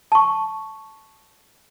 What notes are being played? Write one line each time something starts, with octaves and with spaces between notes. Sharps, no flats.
A5 C#6